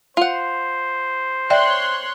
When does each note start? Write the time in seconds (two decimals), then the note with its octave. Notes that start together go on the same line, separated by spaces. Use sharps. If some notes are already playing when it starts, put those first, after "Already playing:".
0.17 F4 C5 F#5
1.50 C#5 D5 E5 G5 C6 F#6